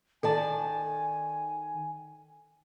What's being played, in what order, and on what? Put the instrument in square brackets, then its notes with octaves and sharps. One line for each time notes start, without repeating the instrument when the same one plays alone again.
[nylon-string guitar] D#3 D5 A5 [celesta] A4 [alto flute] G#5